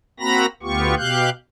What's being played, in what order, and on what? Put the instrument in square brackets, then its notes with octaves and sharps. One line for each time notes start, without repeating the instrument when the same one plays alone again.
[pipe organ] A#3 C4 F#4 A#5 B5 A#6
D2 B3 F4 G4 C#6
B2 G4 F5 F#6 G6